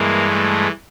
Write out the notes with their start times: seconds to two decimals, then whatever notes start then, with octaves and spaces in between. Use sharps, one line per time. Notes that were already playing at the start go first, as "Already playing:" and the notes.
Already playing: G2 E3 G#3 A#3
0.28 A3